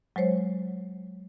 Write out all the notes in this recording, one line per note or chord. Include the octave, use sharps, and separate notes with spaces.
F#3 G#3 C5 C#5